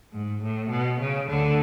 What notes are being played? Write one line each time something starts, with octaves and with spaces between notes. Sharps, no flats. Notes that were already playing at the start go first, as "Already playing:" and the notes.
G#2
A2
B2
C#3
D2 D3